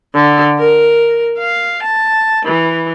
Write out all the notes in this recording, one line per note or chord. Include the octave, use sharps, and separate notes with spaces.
D3
A#4
F5
A5
E3